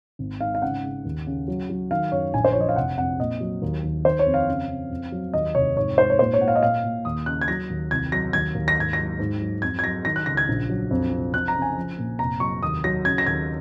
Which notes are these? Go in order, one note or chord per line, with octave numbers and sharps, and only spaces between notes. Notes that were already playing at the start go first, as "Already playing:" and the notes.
G#1
G#2 F5
F5
C#3 F#5
C#3
D#2
C#3
F#3
F#3
D#3 F5
F#2 C#5
A#1 G#5
C5
F3 C#5
D#5
F5
F1 F#5
F2 F#5
A#2 D#5
F#3
D#2
D#2
D#3 C5
C#5
F2
F5
C#3
C#3
F2
F#3
D#2 D#5
F1 C#5
G#2 C#5
G#2 C5
C#5
A#2 C5
C#5
A#2 F#5
F5
D#5
A#2 F5
A#2
D#2 D#6
C#3 F#6
G#6
F#3 A#6
D#2
C2 G#6
F#3 A#6
D#2 G#6
D#2
A#6
G#2 G#6
A#6
F#3
G#2
F#3
F2 G#6
G#6
F#3 A#6
D#3 A#6
F#6
C#2 A#6
G#6
A#1
F#3
F2
C3
F2 F#6
A#5
C#3
G#5
F3
A#2
F1 A#5
F#3 C#6
D#2 D#6
F#3 A#6
C#3 G#6
A#6
D#2 G#6